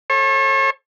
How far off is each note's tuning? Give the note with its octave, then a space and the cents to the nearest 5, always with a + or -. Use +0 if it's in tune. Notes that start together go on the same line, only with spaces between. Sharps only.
A4 -10 C#5 -40